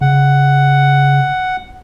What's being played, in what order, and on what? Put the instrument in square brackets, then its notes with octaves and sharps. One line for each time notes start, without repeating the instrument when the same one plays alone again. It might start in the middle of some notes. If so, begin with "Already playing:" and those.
[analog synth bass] C#3 [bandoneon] F#5